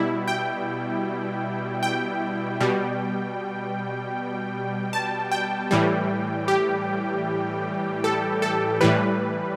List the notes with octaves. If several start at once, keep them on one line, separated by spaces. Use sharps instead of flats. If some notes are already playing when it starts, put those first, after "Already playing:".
Already playing: B2 G3 E4
G5
G5
B2 G3
A5
G5
A2 E3 G3
G4
A4
A4
A2 E3 G3 B4